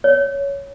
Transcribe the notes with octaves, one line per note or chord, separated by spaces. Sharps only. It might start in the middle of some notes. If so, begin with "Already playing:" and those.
C#5